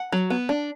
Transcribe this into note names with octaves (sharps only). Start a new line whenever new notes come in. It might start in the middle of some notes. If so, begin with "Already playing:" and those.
Already playing: F#5
F#3
B3
D4